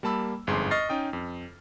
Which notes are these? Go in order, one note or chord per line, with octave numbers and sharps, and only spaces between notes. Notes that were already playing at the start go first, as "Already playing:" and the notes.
G3 A#3 A5 B5 E6
G1 F2 G#2 G#4 C6
D#5 C#6 F6 A6 C7
C#4 D#4 G5 D#6
F2